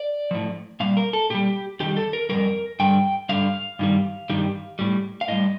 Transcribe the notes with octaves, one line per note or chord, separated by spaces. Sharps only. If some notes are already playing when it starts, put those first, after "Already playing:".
Already playing: D5
A2 F3
A#2 G3 F5
A#4
A4
A#2 G3 G4
F2 D#3 G3 G4
A4
A#4
F2 D#3 G3 A#4
G2 D3 G3 G5
G2 D3 G3 F5
G2 D#3 G3
G2 D#3 G3
A2 G3
F5
A2 G3 D#5